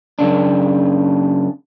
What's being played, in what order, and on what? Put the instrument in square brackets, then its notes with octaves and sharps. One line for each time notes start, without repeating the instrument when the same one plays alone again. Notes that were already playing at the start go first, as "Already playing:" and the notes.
[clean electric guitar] F#2 C#3 D4